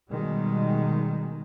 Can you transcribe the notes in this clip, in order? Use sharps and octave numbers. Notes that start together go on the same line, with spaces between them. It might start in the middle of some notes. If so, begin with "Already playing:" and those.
B2 D#3 G3 G#3